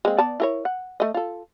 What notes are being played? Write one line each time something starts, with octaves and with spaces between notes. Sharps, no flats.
G#3 A#3 C4
B3 D5 A5
E4 A#4 C#5
F#5
A3 D#5
F4 A4